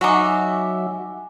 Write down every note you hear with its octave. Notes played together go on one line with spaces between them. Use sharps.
F#3 D#4 F#4 E5 F#5 G#5 D6